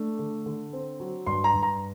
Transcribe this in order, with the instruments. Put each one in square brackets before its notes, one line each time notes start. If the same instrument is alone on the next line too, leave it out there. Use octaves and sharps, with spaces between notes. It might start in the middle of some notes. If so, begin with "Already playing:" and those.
Already playing: [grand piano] A3 D4
D3
D3
C4
F#3
G2 C6
A#5
G2
A#5